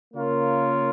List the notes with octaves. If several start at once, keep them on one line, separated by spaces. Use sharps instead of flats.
C#3 A#3 F4 A#4 C#5